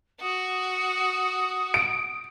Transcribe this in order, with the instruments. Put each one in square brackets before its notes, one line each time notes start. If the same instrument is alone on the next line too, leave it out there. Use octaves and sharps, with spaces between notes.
[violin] F#4 [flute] D#6
[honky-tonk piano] D7